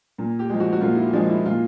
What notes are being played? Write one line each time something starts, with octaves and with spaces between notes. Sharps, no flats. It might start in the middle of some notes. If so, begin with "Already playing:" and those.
A#2
G4
F3 G#3
F#4
F#4
A#2 F4
E4
F3 G#3 D4
E4
A#2 F4